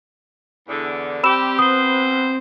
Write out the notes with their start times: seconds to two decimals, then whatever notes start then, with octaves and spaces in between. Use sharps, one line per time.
0.68 E2 D3
1.23 G3 C4 G4 B5 E6 E7
1.59 B2 B4 C5 D#6